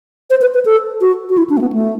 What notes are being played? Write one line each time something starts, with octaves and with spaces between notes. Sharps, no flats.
C5
B4
B4
A4
F#4
F#4
E4
D4
A3
B3
A3